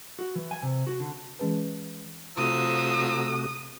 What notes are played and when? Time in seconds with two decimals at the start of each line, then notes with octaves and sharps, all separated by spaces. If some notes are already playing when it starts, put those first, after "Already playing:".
0.19 F#4
0.36 E3
0.51 G#5
0.63 C3
0.87 F#4
1.00 D3
1.39 E3 G#3 C#4 G#4 B4
2.38 C3 F3 A3 F#4 A#5 D#6 E6